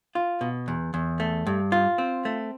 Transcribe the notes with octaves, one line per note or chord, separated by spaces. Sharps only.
F4
B2
E2
E2
A3
G2
F4
C4
A3